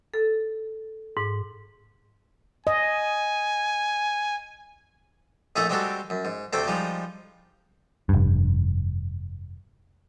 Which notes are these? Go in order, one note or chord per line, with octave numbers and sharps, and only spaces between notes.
A4
G#2
D#5 G#5
A#1 A3 D#4 G#4 A4 E5
G3 G#3 C4 F#4 G4 A4
F#2
G#2
D2 C3 A3 C5 G5 D6
F3 G3 G#3 D#4
F1 G2